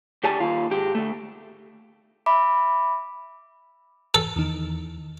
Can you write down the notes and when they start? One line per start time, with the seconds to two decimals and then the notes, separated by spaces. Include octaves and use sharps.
0.24 D2 G4 D5 G#5 A5
0.40 D#2 F4
0.71 G#2 G4
0.95 D2 A3
2.26 E5 B5 D6
4.14 A4
4.36 E2 D#3